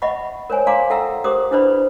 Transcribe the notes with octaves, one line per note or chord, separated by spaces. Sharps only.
D#5 E5 F#5 B5 C#6
A#4 C5 C#5 G#5
D5 F5 G#5 A#5 C6 D6
A4 E5 F#5 G5 A#5 E6
G4 A#4 C5 D6 D#6
D4 E4 B4 C5 D5 B5